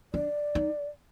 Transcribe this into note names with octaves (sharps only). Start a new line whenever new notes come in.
D4 D5
D#4